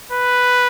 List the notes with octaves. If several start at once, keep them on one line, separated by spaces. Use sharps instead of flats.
B4